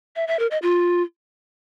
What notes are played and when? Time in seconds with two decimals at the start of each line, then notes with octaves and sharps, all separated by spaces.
0.16 E5
0.28 E5
0.39 A#4
0.51 D#5
0.63 F4